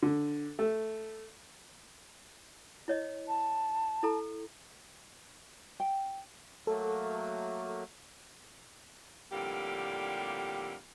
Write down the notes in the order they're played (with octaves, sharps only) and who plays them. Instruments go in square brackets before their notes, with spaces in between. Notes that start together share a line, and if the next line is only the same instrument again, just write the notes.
[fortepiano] D3
A3
[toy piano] E4 C#5 D#5
[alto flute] A5
[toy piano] E4 A4 A#5
[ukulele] G5
[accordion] F#3 A3 A#3 [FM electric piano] A4
[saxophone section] F2 A2 D3 G3 A#3 G4